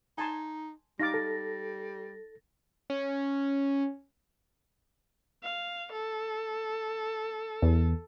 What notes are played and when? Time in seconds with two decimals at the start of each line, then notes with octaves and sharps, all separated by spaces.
0.18 D#4 G#5 A5 C6
1.00 G3 D#4 F5 D6 A6 A#6
1.14 A4
2.90 C#4
5.43 F5
5.92 A4
7.62 E2